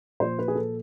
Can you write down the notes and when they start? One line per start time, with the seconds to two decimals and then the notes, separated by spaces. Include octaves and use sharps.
0.20 A#2 F3 C5
0.39 B4
0.48 G#4
0.55 A4